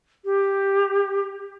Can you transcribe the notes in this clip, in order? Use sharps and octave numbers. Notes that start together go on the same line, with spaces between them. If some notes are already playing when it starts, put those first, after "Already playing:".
G4